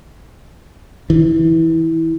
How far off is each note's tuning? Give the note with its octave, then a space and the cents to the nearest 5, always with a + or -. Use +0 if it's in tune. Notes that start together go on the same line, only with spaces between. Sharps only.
E3 -20